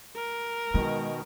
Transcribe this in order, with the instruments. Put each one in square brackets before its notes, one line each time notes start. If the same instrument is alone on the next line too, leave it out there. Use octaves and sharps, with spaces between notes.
[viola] A#4
[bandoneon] B2 D#3 [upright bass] G#3